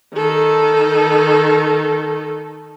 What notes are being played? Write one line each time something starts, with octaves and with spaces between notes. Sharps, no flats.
D#3 A4